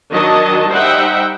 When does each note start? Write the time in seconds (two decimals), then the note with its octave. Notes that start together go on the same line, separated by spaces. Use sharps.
0.12 D#3 F#3 D4 D#5 A5
0.71 G3 D#4 C5 E5 F#5 G5